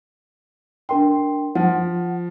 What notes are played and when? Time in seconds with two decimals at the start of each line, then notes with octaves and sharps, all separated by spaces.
0.89 D4 A#4 G5 C6
1.55 F3 F#5